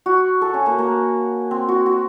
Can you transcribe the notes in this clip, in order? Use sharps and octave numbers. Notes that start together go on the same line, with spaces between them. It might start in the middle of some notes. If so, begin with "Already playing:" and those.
F#4
A4
C#4
A#3
A#3
C4
F#4
F#4